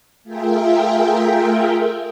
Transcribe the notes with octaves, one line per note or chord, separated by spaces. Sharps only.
A3 F4 G#4 A#4 E5 G5